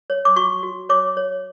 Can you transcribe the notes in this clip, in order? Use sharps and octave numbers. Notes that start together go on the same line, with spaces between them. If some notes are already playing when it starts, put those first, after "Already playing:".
C#5
D6
F#4 C#6
F#4
C#5 D6
C#5